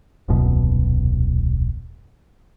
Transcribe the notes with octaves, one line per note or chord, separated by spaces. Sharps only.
D#1 C2 F#2 B2